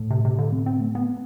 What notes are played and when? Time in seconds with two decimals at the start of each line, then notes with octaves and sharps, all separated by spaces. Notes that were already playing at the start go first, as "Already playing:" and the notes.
Already playing: A2
0.11 C3
0.25 C3
0.39 D3
0.52 C4
0.66 C4
0.80 A3
0.95 B3